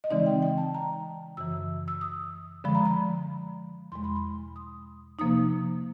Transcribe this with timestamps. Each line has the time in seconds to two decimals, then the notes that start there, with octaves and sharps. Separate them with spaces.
0.04 D#5
0.10 C#3 E3 G#3 C4 D#4 D5
0.26 G5
0.42 G5
0.58 A5
0.74 A#5
1.37 F#2 C#3 E3 E6
1.88 E6
2.01 D#6
2.64 D3 F3 G#3 B5
2.75 A#5
2.85 B5
3.92 E2 B2 G#3 C6
4.04 B5
4.16 C6
4.56 D#6
5.19 C3 F3 A#3 D#4 D#6